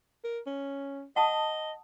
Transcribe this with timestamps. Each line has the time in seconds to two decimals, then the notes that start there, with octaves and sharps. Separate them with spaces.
0.24 A#4
0.46 C#4
1.16 D#5 F#5 A5 D#6